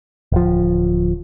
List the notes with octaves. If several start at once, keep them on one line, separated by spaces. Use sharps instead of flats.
D1 F3